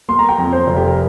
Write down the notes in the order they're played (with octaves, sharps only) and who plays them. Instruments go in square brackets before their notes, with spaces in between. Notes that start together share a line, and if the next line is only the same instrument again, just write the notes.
[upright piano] A#3 C6
A#5
G5
F2 A#5
C5
F1
G4
A#4